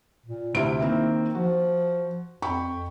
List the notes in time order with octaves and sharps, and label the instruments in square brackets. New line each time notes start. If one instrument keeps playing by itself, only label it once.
[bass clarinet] A#2
[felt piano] D2 C3 D7 [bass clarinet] E4
[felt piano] D#3 A#3 C4
[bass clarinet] F3 [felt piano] F#4
[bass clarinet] F2 [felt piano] G5 B5 C#6